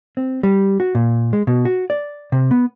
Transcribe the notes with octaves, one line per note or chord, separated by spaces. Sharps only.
C4
G3
F#4
A#2
G#3
B2
F#4
D5
C3
B3